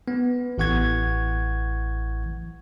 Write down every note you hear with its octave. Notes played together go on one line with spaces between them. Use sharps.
B3
A1 E3 F#5 C#6 G#6